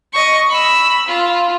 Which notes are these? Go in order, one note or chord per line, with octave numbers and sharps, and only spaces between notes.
D#5 C#6
B5 E6
F4